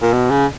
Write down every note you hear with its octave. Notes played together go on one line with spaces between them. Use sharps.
A#2
B2
C#3